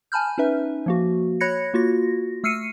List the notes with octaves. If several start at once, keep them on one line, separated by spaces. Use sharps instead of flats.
G#5 A5 B5 F6 G6
C#4 D#4 B4 E5
F3 A#3 F#4
C#5 B5 F#6 G#6 A#6 C#7
A#3 F4 F#4 A#6
A3 E6 F6 C7 C#7 D#7